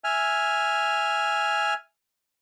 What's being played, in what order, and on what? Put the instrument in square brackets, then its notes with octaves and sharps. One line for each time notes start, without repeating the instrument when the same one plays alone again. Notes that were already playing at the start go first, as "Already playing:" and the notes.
[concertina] E5 G#5 F6